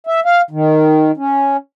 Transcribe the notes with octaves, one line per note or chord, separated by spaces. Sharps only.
E5
F5
D#3
C#4